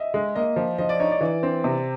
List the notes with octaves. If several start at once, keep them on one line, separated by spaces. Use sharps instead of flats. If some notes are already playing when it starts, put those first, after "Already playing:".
Already playing: D#5 E5
G#3
A#3 D#5
F3
F3 D#5
D5
D#4 C#5
D5
E3
C4
C3